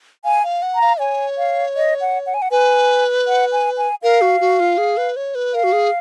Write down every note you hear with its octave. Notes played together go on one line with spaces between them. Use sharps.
F5 G#5
F5
F#5
A#5
F5
C#5 G#5
F5
D#5
F#5
F#5
G#5
F#5
B4 G#5
F#5
G#5
G#5
A#4 F5
F#4
F#4
F4
G#4
B4
C#5
B4
A#4 F5
F#4
G#4